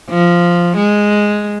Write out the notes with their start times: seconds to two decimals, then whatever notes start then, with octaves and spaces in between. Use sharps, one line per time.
0.10 F3
0.77 G#3